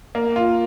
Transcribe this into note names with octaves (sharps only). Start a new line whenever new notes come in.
A#3
F4